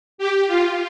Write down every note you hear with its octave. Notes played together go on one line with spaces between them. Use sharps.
G4
F4